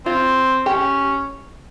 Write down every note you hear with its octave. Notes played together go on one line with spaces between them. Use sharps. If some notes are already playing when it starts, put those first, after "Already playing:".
C4 F4
C#4 G4